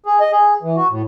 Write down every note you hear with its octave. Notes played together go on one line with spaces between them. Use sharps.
G#4
D#5
G#4
E3
F#4
A2